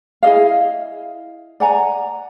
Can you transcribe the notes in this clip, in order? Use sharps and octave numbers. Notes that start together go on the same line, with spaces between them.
E4 G#4 D#5 F5
D5 F#5 G#5 A#5